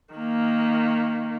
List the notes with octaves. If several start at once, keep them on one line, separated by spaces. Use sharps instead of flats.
D#3 A#3